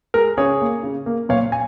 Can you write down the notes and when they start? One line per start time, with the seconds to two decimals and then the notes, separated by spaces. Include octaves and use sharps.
0.14 G#3 A#4
0.37 C#3 G#4 C#5
0.61 A#3
0.83 C#3
1.06 A#3
1.29 A#2 C#5 F5
1.52 G#5